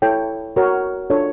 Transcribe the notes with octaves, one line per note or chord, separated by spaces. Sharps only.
E4 A4 C#5 G5
F#4 A#4 C#5
D4 F4 A4 C#5